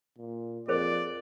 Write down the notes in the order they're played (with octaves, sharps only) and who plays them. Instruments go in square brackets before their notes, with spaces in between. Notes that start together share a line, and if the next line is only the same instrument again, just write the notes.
[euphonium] A#2
[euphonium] F2 [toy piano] G#4 A#4 C5 [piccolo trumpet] D5